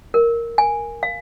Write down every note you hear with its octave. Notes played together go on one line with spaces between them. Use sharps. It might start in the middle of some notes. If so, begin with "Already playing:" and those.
A#4
G#5
F5